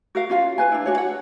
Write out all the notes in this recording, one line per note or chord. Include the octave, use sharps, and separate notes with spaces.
F#4 A#4 F5
C#4 F4 F5
F4 B4 G#5
D4 E4
D4 F#4 C#5
F#5